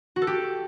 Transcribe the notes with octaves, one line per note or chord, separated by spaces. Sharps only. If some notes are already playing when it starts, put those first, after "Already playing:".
F#4
A4
G4